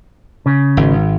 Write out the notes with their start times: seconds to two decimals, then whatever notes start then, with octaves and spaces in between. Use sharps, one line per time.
0.46 C#3
0.77 G#1